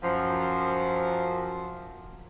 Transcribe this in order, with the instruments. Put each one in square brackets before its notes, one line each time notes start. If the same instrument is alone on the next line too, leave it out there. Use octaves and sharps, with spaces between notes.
[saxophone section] F#2 F3